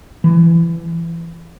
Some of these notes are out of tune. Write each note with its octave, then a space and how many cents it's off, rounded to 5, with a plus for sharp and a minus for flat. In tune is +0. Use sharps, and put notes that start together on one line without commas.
E3 +25